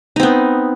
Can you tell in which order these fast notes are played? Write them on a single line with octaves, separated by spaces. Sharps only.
D#4 C4 B3